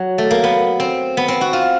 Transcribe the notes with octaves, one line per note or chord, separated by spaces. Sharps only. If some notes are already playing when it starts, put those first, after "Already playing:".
Already playing: F#3
A3
A#3
B3
C4
B3
C4
F#4
F4